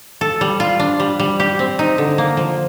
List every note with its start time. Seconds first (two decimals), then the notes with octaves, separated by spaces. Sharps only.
0.21 A4
0.41 G3
0.60 F4
0.79 D4
1.00 G3
1.19 G3
1.40 G4
1.59 C4
1.79 D#4
1.98 D3
2.18 A#3
2.37 F3